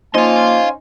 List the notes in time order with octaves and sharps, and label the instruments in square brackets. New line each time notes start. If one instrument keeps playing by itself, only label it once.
[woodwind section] F3 A#3 [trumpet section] C#4 C5 G#5 [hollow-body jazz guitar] D#4 [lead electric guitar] F5 C6